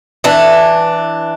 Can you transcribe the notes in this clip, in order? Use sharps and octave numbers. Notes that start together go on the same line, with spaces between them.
E3 D4